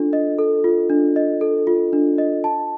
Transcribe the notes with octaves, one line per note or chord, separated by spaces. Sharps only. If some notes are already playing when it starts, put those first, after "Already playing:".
Already playing: D4 F4 A4
D#5
A4
F4
D4
D#5
A4
F4
D4
D#5
A5